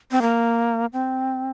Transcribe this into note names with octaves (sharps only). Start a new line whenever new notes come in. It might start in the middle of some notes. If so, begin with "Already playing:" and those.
C4
A#3
C4